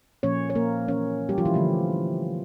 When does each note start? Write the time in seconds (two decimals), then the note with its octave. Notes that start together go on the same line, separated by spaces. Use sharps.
0.23 A#2 F3 A#3 C#4 C#5
0.50 C#5
0.55 A#3 A#4
0.88 E3 A#3 C#4 C#5
1.29 G3 G4
1.38 F3 F4
1.45 E3 E4
1.54 D3 F3 A3